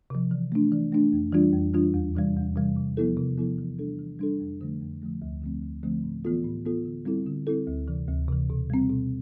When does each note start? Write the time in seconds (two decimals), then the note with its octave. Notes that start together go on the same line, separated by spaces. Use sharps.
0.10 C3 F3
0.31 E3
0.52 A3 D4
0.72 E3
0.92 A3 D4
1.13 F2
1.33 E3 G3 D4 F4
1.53 F2
1.74 E3 G3 D4 F4
1.94 E2
2.15 C3 E3 G3
2.36 E2
2.56 C3 E3 G3
2.76 C3
2.97 F3 B3 E4 A4
3.17 C3
3.38 F3 B3 E4 A4
3.58 E3
3.78 G3 D4 A4
3.99 E3
4.19 G3 D4 A4
4.40 F2
4.61 D3 F3 A3
4.81 F2
5.02 D3 F3 A3
5.22 D2
5.42 D3 F3 A3 C4
5.63 D2
5.83 D3 F3 A3 C4
6.04 A2
6.24 E3 B3 F4 A4
6.45 A2
6.65 E3 B3 F4 A4
6.85 D3
7.05 G3 C4 E4 A4
7.27 D3
7.47 G3 C4 E4 A4
7.67 D2
7.88 C3 E3
8.08 D2
8.28 C3 E3
8.50 B2
8.70 G3 C4
8.90 B2